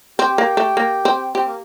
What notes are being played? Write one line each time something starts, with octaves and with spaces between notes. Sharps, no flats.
C4 G4
A#3
A3
A#3
C4
C4 G4
A#3